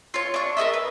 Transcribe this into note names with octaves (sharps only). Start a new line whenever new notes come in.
F4 C#5
D4 C#6
A#4 B4 D#5 E5
B4